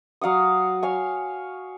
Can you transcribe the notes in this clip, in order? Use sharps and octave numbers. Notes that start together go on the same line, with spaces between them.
F#3 F5 F#5 D#6
C#5 F5 G#5